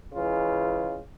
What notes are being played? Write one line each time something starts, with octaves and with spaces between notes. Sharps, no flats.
C#3 E3 G#3 F4